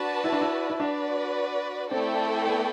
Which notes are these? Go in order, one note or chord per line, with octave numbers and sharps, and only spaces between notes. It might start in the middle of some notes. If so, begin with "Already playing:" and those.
Already playing: D4 F#4 B4 D5 A5
E4
D4
E4
E4
D4 F#4 B4 D5
A3 C4 E4 A4 D5 G5
B3